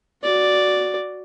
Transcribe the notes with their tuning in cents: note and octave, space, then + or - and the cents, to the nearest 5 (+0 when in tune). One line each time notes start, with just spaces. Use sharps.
F#4 +0 D5 +0